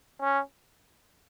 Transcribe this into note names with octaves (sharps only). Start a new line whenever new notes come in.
C#4